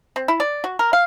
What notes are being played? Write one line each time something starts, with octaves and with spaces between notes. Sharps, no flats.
C4
E4
D5
F#4
A#4
F5